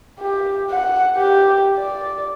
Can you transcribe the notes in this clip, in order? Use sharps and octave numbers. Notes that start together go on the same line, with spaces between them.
G4
F#5
G4
D5